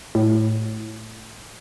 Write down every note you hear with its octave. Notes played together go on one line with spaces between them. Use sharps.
A2